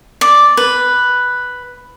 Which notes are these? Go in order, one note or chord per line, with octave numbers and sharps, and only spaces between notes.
D5
B4